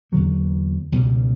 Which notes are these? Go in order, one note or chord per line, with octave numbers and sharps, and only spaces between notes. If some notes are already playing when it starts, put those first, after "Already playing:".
E2 D3 F#3 A#3
C#2 B2 G3